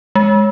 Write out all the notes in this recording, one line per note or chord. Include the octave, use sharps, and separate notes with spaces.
G#3